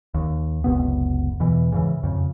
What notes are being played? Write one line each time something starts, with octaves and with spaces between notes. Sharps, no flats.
D#2
F#1 C#2 C3 B3
E2 B2 E3
G#2 C#3 E3
F2 C#3